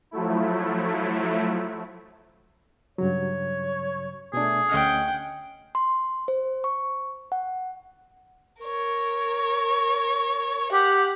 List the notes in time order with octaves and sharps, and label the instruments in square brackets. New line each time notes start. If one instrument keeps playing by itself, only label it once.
[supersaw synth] F3 F#3 A3 E4
[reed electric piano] G2 C#3 F#3 [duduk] C#5
[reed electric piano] B2 D4 [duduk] A3 [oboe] G#4
[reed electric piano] D2 D#5 F6 [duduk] C#4 [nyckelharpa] F#5 G5
[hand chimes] C6
C5
C#6
F#5
[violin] A#4 C#5
[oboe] G4 [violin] F#5